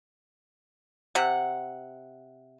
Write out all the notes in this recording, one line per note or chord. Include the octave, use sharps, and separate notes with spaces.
C3 F#5